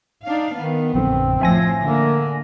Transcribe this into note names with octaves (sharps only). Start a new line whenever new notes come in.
D4 D#4 F5
D#3 B3
A#1 F#2 D3 C4
A2 F3 E5 G#5 A#6
D3 A#3